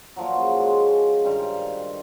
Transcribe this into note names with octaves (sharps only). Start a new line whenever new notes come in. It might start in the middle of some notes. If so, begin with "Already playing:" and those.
A#2 F3 F#3
C#3
G#3
G2 D#3 C5 F5